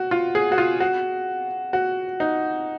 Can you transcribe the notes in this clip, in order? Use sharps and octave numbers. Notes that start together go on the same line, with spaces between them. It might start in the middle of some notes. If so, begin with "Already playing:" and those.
Already playing: F#4
F4
G#4
F#4
F4
F#4
F#4
D#4